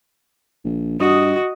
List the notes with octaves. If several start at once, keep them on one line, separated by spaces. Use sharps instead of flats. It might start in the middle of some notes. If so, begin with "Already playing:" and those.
A#1
G2 F#4 D#5